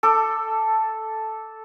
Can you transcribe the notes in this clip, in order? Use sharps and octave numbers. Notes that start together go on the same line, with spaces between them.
A4 D6